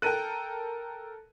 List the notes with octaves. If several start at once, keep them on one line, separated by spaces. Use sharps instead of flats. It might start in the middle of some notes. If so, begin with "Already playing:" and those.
A4 A#4 G5 F#6 D#7